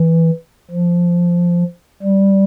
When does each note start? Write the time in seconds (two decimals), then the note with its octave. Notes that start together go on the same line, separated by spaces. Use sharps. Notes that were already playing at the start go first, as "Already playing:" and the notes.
Already playing: E3
0.70 F3
2.03 G3